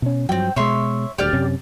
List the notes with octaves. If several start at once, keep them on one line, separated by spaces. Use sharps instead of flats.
B2 C#4
G2 F3 F#3 C4 G5
B2 G#3 C#5 E5 C6
D#1 D2 G4 D5 F6
F#2 C3 C#4